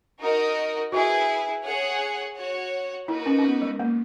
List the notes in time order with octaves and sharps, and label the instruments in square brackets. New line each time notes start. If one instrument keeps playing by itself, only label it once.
[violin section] D#4 F#4 A#4 D#5
[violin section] E4 G#4 B4 [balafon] F#4
[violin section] G#4 C#5 F#5
F#4 C#5 F#5
[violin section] A#3 D#4 F#4 B4 [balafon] E4
[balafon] C#4
C#4
B3
G#3
A#3